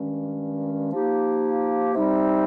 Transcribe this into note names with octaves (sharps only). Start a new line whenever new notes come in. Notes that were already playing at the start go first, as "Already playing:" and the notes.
Already playing: G2 D#3 G#3 C#4
F3 A#3 D#4 G4
C3 G3 C4 D#4